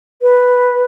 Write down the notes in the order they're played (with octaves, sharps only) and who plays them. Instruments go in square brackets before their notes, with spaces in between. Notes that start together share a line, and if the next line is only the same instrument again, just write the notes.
[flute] B4